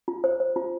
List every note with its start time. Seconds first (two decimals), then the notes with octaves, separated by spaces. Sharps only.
0.08 F4
0.24 C5
0.40 C5
0.56 F4